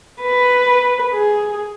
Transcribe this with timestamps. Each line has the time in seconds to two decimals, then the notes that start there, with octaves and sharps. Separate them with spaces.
0.23 B4
1.14 G#4